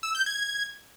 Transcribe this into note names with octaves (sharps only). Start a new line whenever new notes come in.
E6
G6
G#6